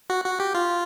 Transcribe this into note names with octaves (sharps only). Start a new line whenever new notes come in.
F#4
F#4
G4
F4